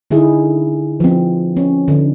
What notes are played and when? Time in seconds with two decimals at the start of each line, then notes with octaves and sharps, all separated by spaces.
0.11 D3 D#4 E4 G#4
1.00 F3 C4
1.57 C#4
1.88 D3 D#4